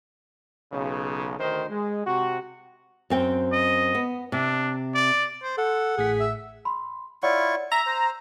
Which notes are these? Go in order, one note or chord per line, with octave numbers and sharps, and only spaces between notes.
B1 C#3
D2 D#3 D#4 C5
G#3
C3 F#4
F#2 C4 G5
D#5
B3
C3 D4
D5
C5
A4 F#5
A1 A2 G#4 B6
E5
B5 C6
E4 F4 C#5 D5 F#5 C#6
E5 A#5 E6
C5